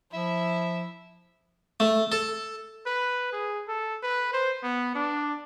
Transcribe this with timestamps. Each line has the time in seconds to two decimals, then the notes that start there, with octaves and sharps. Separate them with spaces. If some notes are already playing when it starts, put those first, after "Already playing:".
0.13 F3 E4 E5
1.80 A3
2.12 A4
2.87 B4
3.33 G#4
3.68 A4
4.03 B4
4.33 C5
4.63 B3
4.95 D4